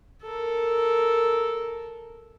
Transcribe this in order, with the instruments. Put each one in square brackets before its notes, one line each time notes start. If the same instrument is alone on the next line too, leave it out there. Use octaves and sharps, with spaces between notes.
[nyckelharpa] A4 A#4